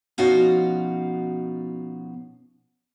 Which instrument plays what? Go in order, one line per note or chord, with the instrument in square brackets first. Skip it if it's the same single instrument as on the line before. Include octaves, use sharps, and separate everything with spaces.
[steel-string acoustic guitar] B2 F3 C#4 D#4 F4 F#4